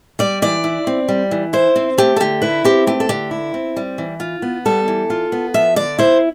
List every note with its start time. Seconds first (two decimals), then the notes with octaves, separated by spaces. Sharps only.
0.19 G3 D5
0.42 E3 D5
0.64 E4
0.87 C4
1.08 G3
1.31 E3
1.53 E4 C5
1.76 C4
1.98 A3 G4
2.16 A4
2.20 D3 G4
2.42 E4 B4
2.64 C4 G4
2.87 A3 G4
3.00 A4
3.09 D3 G4
3.31 E4
3.54 C4
3.77 G3
3.98 E3
4.20 F4
4.42 B3
4.65 G3 A4
4.88 E3
5.10 F4
5.32 B3
5.54 F3 E5
5.76 D3 D5
5.99 E4 C5